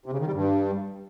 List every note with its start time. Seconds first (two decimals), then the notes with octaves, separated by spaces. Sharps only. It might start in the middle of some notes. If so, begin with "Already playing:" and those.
0.06 C3
0.13 C#3
0.20 D#3
0.27 G3
0.34 G2